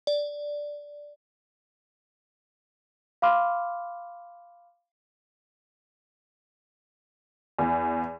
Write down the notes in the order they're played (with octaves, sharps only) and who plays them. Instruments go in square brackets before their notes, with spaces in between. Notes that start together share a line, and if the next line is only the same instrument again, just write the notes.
[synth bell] D5
[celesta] F5 B5 C6 D6 F6
[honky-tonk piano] E2